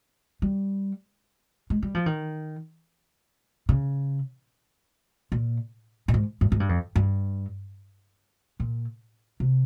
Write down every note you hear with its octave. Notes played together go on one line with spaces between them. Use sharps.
G3
G#3
G3
F3
D#3
C#3
A#2
A#2
G#2
G2
G#2
G2
F2
G2
A#2
C3